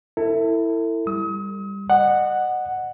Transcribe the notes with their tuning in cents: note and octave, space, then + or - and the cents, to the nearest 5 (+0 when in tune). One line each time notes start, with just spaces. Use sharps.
E4 +0 A4 +35
G3 +15 D#6 +40
D#5 -35 F#5 +0